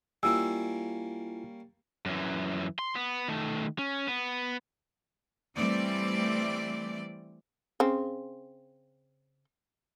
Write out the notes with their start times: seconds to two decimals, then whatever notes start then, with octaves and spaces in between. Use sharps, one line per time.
0.23 G3 A#3 C#4 E4 F4 G#5 E6
2.06 F#2 E3
2.79 C6
2.96 B3
3.28 D#3 A3
3.79 C#4
4.08 B3
5.57 E3 G3 A3 C4 D5
7.80 C#3 C4